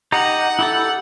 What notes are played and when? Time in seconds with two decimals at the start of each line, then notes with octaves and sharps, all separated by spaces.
0.12 D#4 G4 F#5 A#5
0.59 E4 G4 A4